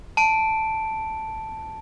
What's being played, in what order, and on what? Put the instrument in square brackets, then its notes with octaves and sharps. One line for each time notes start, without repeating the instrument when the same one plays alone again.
[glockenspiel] A5 D7